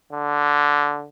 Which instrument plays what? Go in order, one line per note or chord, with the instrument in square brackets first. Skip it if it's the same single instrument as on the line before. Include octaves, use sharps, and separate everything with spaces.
[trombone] D3